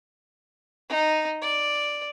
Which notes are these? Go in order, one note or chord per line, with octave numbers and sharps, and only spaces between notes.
D#4
D5